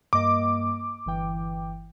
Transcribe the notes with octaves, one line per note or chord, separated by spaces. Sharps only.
G2 A#3 D#5 D6
G1 E3 G5